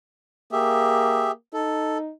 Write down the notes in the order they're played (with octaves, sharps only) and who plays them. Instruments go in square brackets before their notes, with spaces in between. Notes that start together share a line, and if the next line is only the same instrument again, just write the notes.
[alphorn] A#3 [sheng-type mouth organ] G4 G#4 E5
[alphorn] D#4 [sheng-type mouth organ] A4